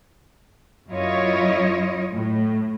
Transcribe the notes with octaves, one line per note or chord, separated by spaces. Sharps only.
F#2 E4 F4 C#5 D#5
A2